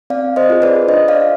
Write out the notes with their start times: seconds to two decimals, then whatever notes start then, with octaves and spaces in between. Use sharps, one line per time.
0.10 C4 D5 F5
0.36 C5 D#5
0.50 F4 G#4
0.62 B4 D5
0.88 D4 C5 D#5
1.08 D5 F5